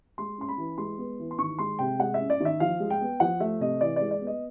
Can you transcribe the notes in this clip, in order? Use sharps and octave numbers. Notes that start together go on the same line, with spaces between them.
G#3 C6
C#4 C6
B5
E3
G#3 C6
B3
E3
C6
D#3 C#6
G#3 C6
C3 G5
G#3 F#5
E5
C#4
D5
D#3 E5
F3 F5
G#3
G5
B3
F3 F#5
A3 E5
C3 D#5
E3 D5
G#3 D5
D5
B3
D#5